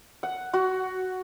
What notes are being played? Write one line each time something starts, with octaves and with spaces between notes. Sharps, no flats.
F#5
F#4